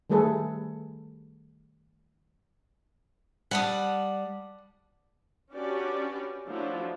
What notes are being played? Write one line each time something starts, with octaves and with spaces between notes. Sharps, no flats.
D#3 G3 A3 G#4 A4 B4
G3 F#5 A5 D#6
C#4 D4 F#4 G4 B4 D5
F3 F#3 A3 D4 E4